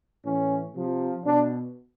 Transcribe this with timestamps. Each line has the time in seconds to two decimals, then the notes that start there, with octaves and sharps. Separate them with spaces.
0.25 A2 E3 C#4
0.75 C3 F3
1.24 B2 D4